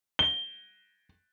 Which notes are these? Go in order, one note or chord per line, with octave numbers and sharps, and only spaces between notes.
G7